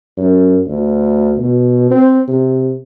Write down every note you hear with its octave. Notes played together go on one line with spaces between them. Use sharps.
F#2
D2
B2
C4
C3